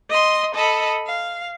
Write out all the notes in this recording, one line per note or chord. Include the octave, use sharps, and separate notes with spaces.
D#5 C6
A4 D#5 B5
F5